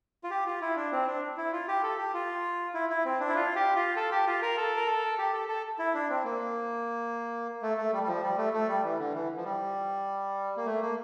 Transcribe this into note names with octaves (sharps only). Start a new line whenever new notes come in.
F4
G4
F4
E4
D4
C4
D4
E4
F4
G4
A4
G4
F4
E4
E4
C4
D4
E4
F4
G4
F4
A4
G4
F4
A#4
A4
A#4
A4
G4
A4
A4
E4
D4
C4
A#3
A3
A3
G3
G3
F3
G3
A3
A3
G3
E3
D3
E3
F3
G3
A#3
A3
A#3